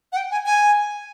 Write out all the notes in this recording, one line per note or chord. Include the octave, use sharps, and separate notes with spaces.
F#5
G5
G#5
G#5